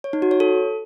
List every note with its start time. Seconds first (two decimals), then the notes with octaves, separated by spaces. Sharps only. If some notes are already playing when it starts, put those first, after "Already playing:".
0.04 C#5
0.13 D#4
0.22 F#4
0.31 C#5
0.40 A4